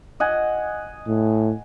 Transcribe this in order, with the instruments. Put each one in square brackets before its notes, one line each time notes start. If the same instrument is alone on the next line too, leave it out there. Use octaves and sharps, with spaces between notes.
[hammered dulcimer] D#5 F#5 G#5
[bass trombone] A2